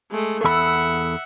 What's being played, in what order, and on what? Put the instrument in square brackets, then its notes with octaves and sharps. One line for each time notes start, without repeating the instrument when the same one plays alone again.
[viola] G#3 A3
[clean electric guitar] E2 A4 B5 [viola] E5 F#5